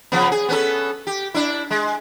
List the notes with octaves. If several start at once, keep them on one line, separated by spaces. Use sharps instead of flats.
C#3 F3 B3
G#4
B3 C#4 A4
G4
D4 E4
G#3